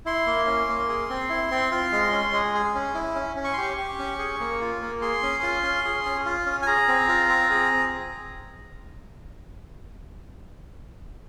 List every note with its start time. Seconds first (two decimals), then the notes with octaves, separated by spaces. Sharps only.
0.05 E4 C6
0.26 A#3
0.47 C#4
0.69 A#3
0.89 G#4
1.10 C4
1.30 E4
1.51 C4
1.71 F4
1.92 G#3
2.12 C#4
2.33 G#3
2.54 G#4
2.75 C#4
2.95 E4
3.15 C#4
3.36 C#4
3.44 C#6
3.53 C6
3.57 G4 C#6
3.77 G4
3.99 C#4
4.18 G#4
4.40 A#3
4.61 F4
4.82 A#3
5.02 G#4 C6
5.23 C#4
5.43 F4
5.63 C#4
5.85 G#4
6.05 C#4
6.25 F4
6.46 C#4
6.62 G#5
6.67 G#4 A#5
6.88 C4
7.08 F4
7.29 C4
7.50 G#4